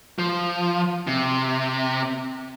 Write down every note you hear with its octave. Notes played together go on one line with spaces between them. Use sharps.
F3
C3